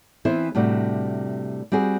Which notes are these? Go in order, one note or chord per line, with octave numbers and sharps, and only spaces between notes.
E3 B3 C4 E4 C5
A2 C3 G3 D4 F#4
G3 C4 F#4 G#4